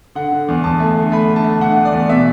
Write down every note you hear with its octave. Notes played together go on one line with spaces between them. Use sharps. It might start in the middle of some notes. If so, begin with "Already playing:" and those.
D3 F#5
D3
E2
E2 A5
A3
D3
A3 B5
D3
A5
A3
D3 F#5
A3
D5
E2
B2 E5